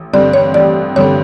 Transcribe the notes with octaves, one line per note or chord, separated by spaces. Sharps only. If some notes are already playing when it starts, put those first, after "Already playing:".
Already playing: A1
G2 D3 G3 C4 D5
C#5
A1 D5
G2 D3 G3 C4 C#5